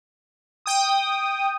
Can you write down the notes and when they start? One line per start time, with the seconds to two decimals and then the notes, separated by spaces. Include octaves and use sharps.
0.66 G5 D#6